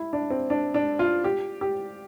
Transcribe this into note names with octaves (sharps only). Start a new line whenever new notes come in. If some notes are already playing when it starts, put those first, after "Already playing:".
Already playing: E4
D4
C4
D4
D4
F4
G4
G4